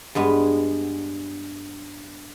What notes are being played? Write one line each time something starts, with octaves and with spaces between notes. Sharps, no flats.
G2 G#3 B3